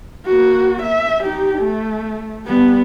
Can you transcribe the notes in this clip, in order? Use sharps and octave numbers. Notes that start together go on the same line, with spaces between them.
A#3 F#4
E5
D#4 G4
A3
G3 B3